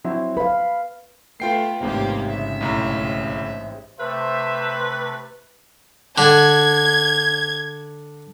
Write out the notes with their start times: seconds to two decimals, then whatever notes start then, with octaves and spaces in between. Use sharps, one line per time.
0.04 F#3 C4 E4
0.37 B4 F5 B5
1.40 A3 B3 F4 G5 C7
1.80 A1 G#2 C3 A#3 B3 G4
2.29 C#3 E5
2.61 B1 A2 A#5
4.00 C3 A3 B4 C5 E5
6.18 D3 G#6